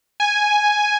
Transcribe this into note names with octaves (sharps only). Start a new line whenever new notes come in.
G#5